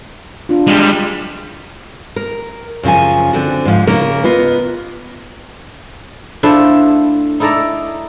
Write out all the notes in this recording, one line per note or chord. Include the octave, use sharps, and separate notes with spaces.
D4 F4
G3 G#3
A#4
F#2 C#3 F3 G#5
D3 C4 F#4
G#2 F3
C#3 A#3 D#4 A#4
B3 F4 D#5
A3 D4 E4 F4 A4 C5
D#4 E4 A4 D5 A#5